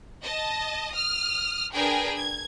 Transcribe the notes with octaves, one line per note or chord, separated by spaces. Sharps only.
D#5 A5
D#6 F6
D4 G#4 A#4 B4 G5 G#5
G#6